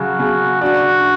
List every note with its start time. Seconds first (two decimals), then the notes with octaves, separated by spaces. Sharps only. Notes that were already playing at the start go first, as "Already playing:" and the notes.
Already playing: C#3 F#3 F#4
0.19 C#3
0.61 D4 F#4